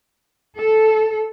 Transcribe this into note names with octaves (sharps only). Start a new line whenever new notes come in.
A4